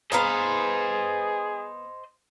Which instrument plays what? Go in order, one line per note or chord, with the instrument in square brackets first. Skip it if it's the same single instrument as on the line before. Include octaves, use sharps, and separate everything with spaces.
[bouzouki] B3 F5 A#5 [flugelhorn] G#4 [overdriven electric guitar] C5 D#5